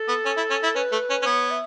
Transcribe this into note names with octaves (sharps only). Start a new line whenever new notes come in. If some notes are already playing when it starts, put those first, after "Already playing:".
Already playing: A4
B3
C#4
E4
C#4
E4
C#4 B4
A3
C#4
C#4
B3 C#5
E5